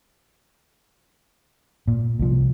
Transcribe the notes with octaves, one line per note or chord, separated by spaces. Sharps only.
A#2
C2 F3